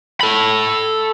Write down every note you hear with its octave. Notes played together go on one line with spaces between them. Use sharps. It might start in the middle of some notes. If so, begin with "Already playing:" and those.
A4 B5